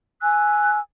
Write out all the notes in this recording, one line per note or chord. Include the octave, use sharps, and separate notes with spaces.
G#5 E6 F#6